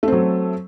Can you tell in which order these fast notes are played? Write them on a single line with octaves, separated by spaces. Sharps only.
A3 C4 F#3